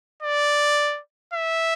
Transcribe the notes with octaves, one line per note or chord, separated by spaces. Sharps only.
D5
E5